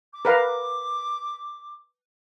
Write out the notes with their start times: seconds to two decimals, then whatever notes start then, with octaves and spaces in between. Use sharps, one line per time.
0.13 D6
0.25 A#4 B4 F5